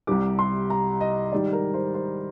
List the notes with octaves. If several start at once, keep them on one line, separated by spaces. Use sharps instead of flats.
C2 C3 G3 D6
C6
A#5
D#5
G#2 D#3 G3 D5
A#4
C5
C5